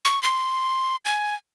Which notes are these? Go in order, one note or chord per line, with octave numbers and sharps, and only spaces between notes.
C#6
C6
G#5